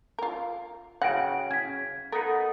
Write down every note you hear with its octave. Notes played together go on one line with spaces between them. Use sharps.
F4 A#4
C#3 F#4 F#5 G5 D7
C#4 G#6 B6
B3 D#4 A4 A#4 F#5